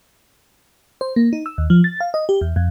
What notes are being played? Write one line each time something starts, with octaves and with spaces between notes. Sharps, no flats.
C5
A#3
D#4
E6
D#2
F3
A6
F5
D#5
G4
E2
F2